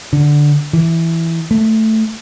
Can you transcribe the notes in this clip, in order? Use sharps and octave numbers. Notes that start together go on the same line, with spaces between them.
D3
E3
A3